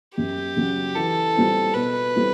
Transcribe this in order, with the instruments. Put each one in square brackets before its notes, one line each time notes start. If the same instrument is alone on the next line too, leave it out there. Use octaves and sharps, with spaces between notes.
[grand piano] F#2 [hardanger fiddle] G4
[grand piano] C#3 F#3
[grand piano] E3 [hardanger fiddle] A4
[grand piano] G3 C4 F4
[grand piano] B2 [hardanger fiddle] B4
[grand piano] G3 C4 E4 A4